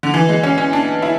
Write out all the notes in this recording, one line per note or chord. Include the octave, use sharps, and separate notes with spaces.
D3
E3
G#3
C#4
C#4
D4
E4